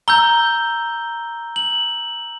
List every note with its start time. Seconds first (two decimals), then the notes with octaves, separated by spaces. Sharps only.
0.08 A#5 E6 G6 G7
1.56 F#7